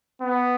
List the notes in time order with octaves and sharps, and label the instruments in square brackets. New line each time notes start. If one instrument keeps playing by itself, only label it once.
[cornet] B3